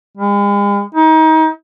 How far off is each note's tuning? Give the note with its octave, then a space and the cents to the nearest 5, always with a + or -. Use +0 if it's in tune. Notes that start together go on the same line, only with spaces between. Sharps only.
G#3 -45
D#4 +30